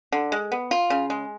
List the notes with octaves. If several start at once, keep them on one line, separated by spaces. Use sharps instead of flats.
D3
G#3
B3
F4
C#3
G#3